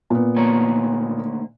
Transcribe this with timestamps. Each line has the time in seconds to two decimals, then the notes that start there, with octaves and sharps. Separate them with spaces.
0.10 A#2 B3
0.36 D2 A#3 C#5